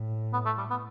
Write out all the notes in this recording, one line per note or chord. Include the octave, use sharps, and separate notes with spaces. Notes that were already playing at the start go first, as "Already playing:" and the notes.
Already playing: A2
B3
A3
G3
B3